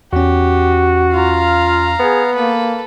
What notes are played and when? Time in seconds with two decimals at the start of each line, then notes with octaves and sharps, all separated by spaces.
0.13 E2 C#4 F#4 G4
1.13 F4 F5 A#5
1.99 B3 G#4
2.34 A#3 A4 B4